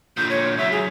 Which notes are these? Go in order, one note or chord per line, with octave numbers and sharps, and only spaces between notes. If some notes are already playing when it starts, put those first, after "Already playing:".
A#2 D3 G6
C#5
C#2 F#3 E5
G#4